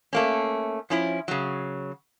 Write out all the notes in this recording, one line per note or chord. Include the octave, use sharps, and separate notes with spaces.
A3 A#3 C#4
F3 C#4 E4
C#3 F#3